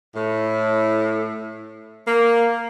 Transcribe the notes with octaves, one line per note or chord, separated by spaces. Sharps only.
A2
A#3